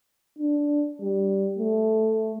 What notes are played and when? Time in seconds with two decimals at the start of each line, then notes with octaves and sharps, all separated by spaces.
0.39 D4
1.01 G3
1.59 A3